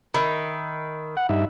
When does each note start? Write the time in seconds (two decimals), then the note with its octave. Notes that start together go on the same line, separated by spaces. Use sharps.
0.14 D#3 E5 B5
1.17 F#5
1.29 G2 D#4 E5